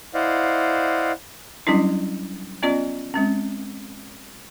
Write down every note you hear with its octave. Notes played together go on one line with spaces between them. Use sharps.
E4 C5 D5 D#5 F5 F#5
F#3 G3 C#4 D4 E4
B3 C#4 F4 D5 D#5
G#3 C4 C#4